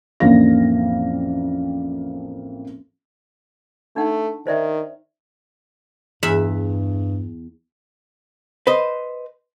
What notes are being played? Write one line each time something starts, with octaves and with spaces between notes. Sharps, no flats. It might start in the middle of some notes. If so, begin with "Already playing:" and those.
A1 F2 A#3 D4 F5 A#6
A3 D4 D#4 F#5
D#3 C5 D5 E5
E2 G2 E5 B5
B4 C5 D#5